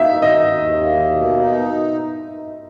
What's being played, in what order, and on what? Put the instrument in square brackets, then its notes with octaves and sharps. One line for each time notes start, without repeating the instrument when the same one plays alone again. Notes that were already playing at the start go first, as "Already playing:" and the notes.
Already playing: [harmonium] A#3 D#4 [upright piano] E5
[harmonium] D#3 [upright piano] D#5
[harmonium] D#2
A#3
B2
D#4